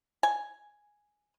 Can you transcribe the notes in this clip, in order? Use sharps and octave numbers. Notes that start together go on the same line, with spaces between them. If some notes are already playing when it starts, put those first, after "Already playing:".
G#5